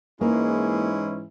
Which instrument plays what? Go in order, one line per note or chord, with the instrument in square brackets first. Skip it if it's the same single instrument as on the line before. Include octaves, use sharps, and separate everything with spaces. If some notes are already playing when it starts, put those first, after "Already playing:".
[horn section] G#2 E3 G#3 C#4 E4 [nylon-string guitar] A#3